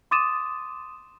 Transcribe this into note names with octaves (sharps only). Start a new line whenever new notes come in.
C6 D6 D#6 A6 D#7 E7